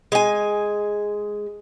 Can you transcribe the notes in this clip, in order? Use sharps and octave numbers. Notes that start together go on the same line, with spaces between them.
G#3 G#5